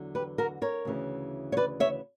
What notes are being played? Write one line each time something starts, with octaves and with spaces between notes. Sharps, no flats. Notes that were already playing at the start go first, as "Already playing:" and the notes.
Already playing: E2 D3 F#3
G4 B4
F#4 A#4
A#4 C#5
D2 C#3 E3
C#5
B4 D5
C#5 E5